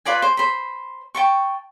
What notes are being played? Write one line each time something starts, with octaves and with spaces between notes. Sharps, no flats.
F4 B4 D5 G#5
C5
C5 B5
G5 A5 C#6